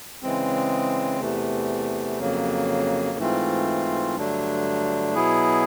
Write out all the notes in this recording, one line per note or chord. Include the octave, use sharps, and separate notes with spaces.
C#3 E3 G#3 C4
E2 C3 E3 A3
F2 C#3 F#3 A#3
G#2 E3 A3 C4 F4
G2 D3 F#3 A3 D4
B2 F#3 B3 E4 G#4